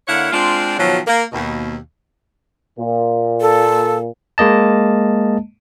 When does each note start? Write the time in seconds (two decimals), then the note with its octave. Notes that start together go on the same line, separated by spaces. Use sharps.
0.08 D3 A#3 E4 C#5 F5 F#5
0.32 G#3 C4 D4 F4
0.78 B2 D#3 F3 F#3
1.06 A#3
1.32 D#2 B2
2.79 A#2
3.41 A4
4.38 G#3 A#3 D#5 A5